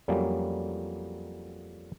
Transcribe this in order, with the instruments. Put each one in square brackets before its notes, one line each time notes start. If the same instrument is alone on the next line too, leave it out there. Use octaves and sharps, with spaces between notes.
[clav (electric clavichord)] F2 F#3 G3 A#3 C#4